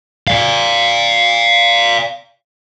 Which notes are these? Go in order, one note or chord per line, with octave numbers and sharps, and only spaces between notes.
D5 F5